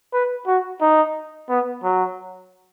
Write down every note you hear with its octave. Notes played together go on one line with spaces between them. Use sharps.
B4
F#4
D#4
B3
F#3